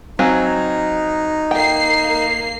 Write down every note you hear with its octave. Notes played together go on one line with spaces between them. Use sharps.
F#3 C4 D#4 F5 G#5
A#3 G5 C7